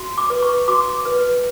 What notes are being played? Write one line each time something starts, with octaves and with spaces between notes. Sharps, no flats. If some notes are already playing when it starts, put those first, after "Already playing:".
Already playing: F#4
D6
B4
C#6
F#4 D6
B4